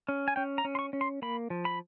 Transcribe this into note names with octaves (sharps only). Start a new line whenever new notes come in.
C#4
G#5
C#4 G5
A#5
C#4
C6
C#6
C#4
C6
A#3 B5
F3
B5